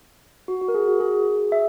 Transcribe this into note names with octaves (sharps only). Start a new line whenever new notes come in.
F#4
F#4
A#4
G#4
F#4
G#4
E5